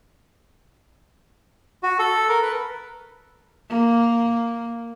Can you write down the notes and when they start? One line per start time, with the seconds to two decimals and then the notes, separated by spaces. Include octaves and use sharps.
1.83 F#4
1.99 A4
2.29 A#4
2.42 B4
3.70 A#3